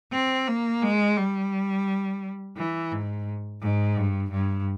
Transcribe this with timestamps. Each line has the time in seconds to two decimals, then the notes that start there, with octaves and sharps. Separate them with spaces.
0.12 C4
0.47 A#3
0.82 G#3
1.17 G3
2.57 E3
2.91 G#2
3.62 G#2
3.97 G2
4.31 G2